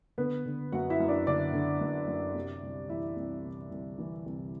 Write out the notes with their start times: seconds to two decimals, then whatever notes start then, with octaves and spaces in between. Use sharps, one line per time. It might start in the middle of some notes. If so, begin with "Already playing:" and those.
0.18 D3 B3 B4
0.46 D3
0.72 F#2 F#4 F#5
0.90 E4 E5
1.00 F#2
1.08 D4 D5
1.27 D3 D4 D5
1.53 D3
1.81 F#2
2.08 F#2
2.35 C3
2.63 C2
2.89 E3 E4 E5
3.16 C2
3.44 C3
3.71 C2
3.99 E3
4.26 C2